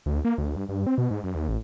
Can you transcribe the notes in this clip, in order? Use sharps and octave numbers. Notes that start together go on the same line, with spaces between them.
D2
A#3
D2
G2
G2
C4
B2
G#2
F#2
D#2
A1